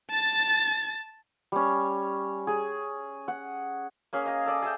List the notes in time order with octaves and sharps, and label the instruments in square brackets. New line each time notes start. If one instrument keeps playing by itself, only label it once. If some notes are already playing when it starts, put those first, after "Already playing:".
[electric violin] A5 A6
[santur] G3 C#4
G#4
F#5
A#3 C#4 G#4
D#5 F5 G#5
A4 D5 D#5
G#4 D#5 E5 G5